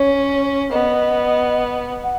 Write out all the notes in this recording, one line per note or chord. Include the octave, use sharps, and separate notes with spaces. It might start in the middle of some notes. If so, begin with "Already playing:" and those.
Already playing: C#4 C#5
B3 D#5
F#5